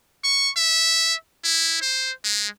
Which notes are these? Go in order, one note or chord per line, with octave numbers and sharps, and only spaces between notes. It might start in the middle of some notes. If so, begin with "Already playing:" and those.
C#6
E5
E4
C5
G#3